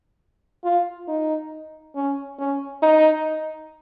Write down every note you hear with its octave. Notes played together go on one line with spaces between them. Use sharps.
F4
D#4
C#4
C#4
D#4